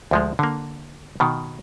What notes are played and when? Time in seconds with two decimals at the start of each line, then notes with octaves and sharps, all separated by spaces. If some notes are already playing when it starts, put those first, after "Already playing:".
0.11 D2 F3 G#3
0.39 D3 A#3
1.20 B2 D#3